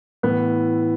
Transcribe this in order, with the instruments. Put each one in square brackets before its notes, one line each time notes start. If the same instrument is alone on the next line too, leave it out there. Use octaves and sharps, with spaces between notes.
[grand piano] A2 E3 B3